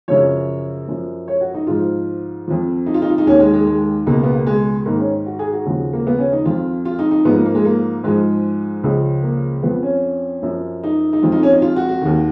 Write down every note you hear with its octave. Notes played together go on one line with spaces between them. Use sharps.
F#2 C#3 F3 C#5
F#2 F3
C#5
F#4
D#4
G#2 F3 F4
F2 F3
D#4
F4
D#4
F4
D#4
D#2 D#3 C#4
G#3
G#3
G#3
C#2 B2 A#3
B3
A#3
G#3
G#2 D#3 A#3
C#4
F#4
G#4
F#4
D#2 C#3 F3
A#3
B3
C#4
D#4
F2 F3 F4
F4
D#4
D#4
G#2 F3 B3
A#3
A#3
G#3
A#3
G#2 F3 G#3
C#2 C#3 F3
A#3
F2 F3 B3
C#4
F#2 F3
D#4
D#4
F2 F3 F4
D#4
C#4
D#4
F4
F#4
F#4
D#2 D#3